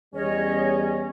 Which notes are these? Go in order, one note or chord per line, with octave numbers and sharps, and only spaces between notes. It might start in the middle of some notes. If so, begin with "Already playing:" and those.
E2 G3 C#4 C#5 D#5